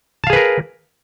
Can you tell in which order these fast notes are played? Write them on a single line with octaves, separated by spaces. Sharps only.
A5 F5 G#4 B4 A#4